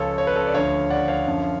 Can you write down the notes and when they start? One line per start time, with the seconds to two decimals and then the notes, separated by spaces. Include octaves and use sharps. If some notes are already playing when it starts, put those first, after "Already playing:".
Already playing: C#2 C#3 F3 A4 C#5
0.18 C#5
0.27 B4
0.36 A4 C#5
0.47 D5
0.54 D2 D3 F3 C#5 F5
0.90 D5 F#5
1.08 C#5 F5
1.27 F#2 D3 F3